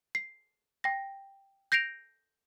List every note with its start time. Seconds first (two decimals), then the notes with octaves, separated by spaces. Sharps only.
0.15 C7
0.84 G5 A#6
1.72 G6 A#6 C7 D7 F7